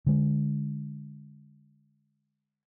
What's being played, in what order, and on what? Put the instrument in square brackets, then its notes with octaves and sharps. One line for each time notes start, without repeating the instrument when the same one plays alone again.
[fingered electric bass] D3 G#3